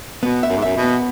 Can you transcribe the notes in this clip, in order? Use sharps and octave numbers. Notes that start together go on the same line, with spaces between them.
B2 B3
E5
F#2
G#2
F#2 E5
B2
B3